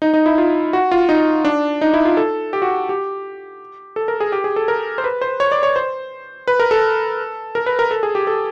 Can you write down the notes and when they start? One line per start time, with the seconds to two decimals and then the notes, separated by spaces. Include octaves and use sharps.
0.02 D#4
0.14 D#4
0.26 E4
0.38 F4
0.73 F#4
0.91 F4
1.09 D#4
1.45 D4
1.81 D#4
1.94 E4
2.05 F4
2.17 A4
2.53 G4
2.62 F#4
2.89 G4
3.96 A4
4.08 A#4
4.20 G#4
4.32 G4
4.44 G#4
4.56 A4
4.68 A#4
4.98 C5
5.04 B4
5.21 C5
5.40 C#5
5.52 D5
5.63 C#5
5.76 C5
6.47 B4
6.60 A#4
6.71 A4
7.55 A#4
7.66 B4
7.79 A#4
7.91 A4
8.03 G#4
8.15 G4
8.27 A4